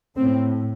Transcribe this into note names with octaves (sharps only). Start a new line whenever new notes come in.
A2 C4